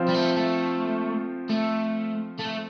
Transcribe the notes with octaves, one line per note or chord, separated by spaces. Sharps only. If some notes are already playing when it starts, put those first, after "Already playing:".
Already playing: F3 C4 F4 C5
G3
A3
A3
A3
A3